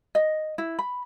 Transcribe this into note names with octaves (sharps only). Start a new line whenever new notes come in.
D#5
E4
B5